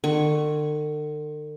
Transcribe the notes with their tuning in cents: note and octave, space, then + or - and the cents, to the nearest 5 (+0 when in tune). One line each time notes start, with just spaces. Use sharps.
D3 +45 C#6 +0